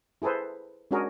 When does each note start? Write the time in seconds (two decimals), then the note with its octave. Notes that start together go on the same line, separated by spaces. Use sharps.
0.22 E4 G#4 A4 B4 C5
0.91 G#3 C#4 D4 F#4 G#4 A#4